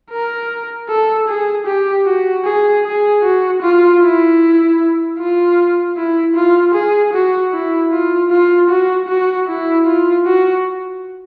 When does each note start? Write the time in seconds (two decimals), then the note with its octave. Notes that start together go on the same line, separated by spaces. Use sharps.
0.11 A#4
0.89 A4
1.28 G#4
1.66 G4
2.05 F#4
2.45 G#4
2.84 G#4
3.23 F#4
3.61 F4
4.01 E4
5.18 F4
5.97 E4
6.36 F4
6.74 G#4
7.13 F#4
7.52 E4
7.92 F4
8.31 F4
8.70 F#4
9.08 F#4
9.47 E4
9.86 F4
10.26 F#4